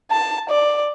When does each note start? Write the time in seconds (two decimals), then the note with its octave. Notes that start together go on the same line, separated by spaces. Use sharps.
0.11 A5
0.50 D5